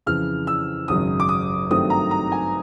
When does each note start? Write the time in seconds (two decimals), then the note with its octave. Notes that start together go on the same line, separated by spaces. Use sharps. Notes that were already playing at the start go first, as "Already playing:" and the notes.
0.06 F2 C#3 E3 F6
0.47 E6
0.88 G#1 F#2 C#3 F#3 D#6
1.20 D6
1.29 D#6
1.70 G2 D#3 F#3 A3 C4 D#6
1.90 A#5
2.11 A#5
2.32 G#5